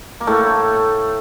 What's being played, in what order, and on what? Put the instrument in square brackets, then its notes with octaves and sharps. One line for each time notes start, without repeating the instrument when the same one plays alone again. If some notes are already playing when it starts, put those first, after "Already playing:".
[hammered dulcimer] A#3
A2 A3